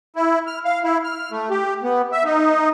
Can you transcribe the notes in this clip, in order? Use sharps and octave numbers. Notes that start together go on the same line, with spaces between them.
E4
F6
F5
E4
F6
A3
G4
B3
E5
D#4